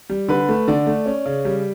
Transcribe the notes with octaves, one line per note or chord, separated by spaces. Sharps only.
G3
D3 B4
A3
D3 D5
A3
C#4
C#3
G3